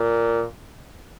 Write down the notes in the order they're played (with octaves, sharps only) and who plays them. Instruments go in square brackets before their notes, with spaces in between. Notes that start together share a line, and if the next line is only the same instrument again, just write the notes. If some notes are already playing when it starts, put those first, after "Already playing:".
Already playing: [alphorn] A#2